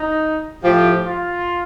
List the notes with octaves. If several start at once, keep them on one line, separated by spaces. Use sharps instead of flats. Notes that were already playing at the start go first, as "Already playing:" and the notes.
Already playing: D#4
A2 F3 G4
F4